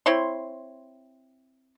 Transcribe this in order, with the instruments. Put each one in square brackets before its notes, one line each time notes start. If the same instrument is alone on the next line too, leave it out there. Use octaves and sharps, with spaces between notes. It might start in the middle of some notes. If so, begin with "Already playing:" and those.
[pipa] C4 E4 C#5 C6